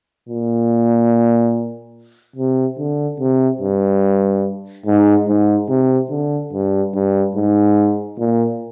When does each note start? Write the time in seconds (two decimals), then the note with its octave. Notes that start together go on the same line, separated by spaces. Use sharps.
0.29 A#2
2.36 C3
2.78 D3
3.20 C3
3.61 G2
4.86 G#2
5.27 G#2
5.69 C3
6.10 D3
6.53 G2
6.94 G2
7.35 G#2
8.19 A#2